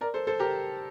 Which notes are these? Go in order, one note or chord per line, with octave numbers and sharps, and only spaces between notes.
A#4 D5
A4 C5
A4 C5
G4 A#4